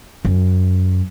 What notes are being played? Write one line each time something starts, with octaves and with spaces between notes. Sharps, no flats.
F#2